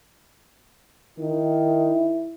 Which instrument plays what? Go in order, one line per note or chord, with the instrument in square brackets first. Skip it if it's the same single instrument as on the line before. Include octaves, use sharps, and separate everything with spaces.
[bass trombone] D#3 [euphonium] E4